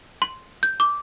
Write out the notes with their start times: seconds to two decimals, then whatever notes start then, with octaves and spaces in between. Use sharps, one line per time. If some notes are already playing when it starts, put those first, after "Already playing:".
0.22 C6
0.63 G6
0.80 D6